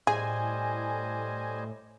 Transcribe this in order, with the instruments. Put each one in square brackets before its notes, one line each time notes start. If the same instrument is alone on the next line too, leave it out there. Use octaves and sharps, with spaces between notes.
[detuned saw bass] A2 [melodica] G3 C5 D#5 [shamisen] G#4 [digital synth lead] G#5